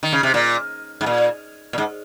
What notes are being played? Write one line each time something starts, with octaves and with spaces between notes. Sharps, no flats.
D#3
C#3
C3
A#2
G#2
A#2
A#2
G#2